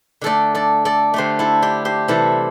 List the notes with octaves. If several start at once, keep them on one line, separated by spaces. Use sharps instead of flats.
D3 A3 A4 D5
A4 D5
A4 D5
D3 A3 G4 C5
E4 A4
D4 G4
G4 C5
C3 E3 G3 E4 A4